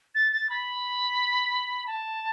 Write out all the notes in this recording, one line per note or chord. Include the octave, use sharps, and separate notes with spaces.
A6
A6
B5
A5